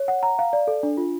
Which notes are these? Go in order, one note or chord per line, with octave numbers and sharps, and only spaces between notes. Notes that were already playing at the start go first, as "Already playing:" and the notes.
Already playing: C#5
F#5
A#5
F5
D5
A4
D4
F4